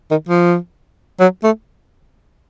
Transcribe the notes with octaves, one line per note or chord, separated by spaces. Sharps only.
D#3
F3
F#3
A3